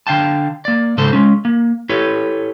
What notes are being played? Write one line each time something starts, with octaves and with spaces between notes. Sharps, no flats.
D3 F5 G5 A5
A#3 D5
G#2 C#3 A4 C5 A5
G#3 C#4
A#3
E4 G4 A4 B4 C#5